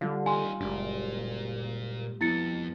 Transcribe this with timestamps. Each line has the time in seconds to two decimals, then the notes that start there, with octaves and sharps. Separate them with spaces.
0.01 D3 G3 F4 F5
0.26 D#4 G4 G#5 C6
0.61 F#1 A#2 G#3 D4 G4 D5
2.21 F2 B3 E4 A6 C#7